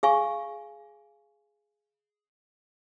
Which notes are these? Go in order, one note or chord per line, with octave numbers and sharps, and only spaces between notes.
G#4 F5 G#5 C#6